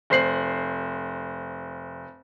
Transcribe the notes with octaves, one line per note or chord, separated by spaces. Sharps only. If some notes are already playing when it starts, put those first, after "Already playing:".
F1 C5 C7 F#7